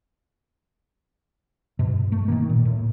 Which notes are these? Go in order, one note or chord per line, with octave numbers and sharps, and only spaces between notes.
G2 B2
A3
D#3 E3 A#3
A#2
A2